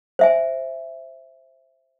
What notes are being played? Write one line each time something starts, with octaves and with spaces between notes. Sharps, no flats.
C5 E5 G#5